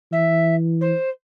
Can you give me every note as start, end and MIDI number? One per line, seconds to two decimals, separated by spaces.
0.12 0.92 52
0.12 0.55 76
0.81 1.09 72